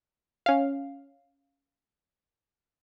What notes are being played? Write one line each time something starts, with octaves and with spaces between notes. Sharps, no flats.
C#4 F5